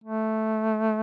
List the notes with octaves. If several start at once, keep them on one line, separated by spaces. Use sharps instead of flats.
A3